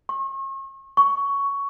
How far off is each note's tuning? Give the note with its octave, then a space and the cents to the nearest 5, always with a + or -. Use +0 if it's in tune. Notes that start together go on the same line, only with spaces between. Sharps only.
C#6 -40
C#6 +10